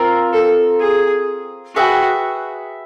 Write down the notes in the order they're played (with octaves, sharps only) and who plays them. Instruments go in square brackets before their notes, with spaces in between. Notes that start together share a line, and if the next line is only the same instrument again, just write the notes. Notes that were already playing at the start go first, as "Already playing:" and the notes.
Already playing: [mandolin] C4 F4 A#4
[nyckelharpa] A4
G#4
[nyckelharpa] F#4 [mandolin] G#4 B4 E5 G5